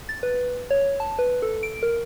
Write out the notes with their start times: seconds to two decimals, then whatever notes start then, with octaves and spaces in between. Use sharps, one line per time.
0.09 A6
0.23 B4
0.70 C#5
1.00 A5
1.19 B4
1.42 A4
1.63 D7
1.83 A#4